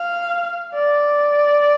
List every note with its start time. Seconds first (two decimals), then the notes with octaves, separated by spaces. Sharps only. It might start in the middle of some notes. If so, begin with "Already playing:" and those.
Already playing: F5
0.74 D5